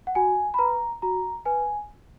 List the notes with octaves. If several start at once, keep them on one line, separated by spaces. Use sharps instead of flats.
F#5
F#4 G#5
B5
B4 A#5
F#4 A#5
B4 G#5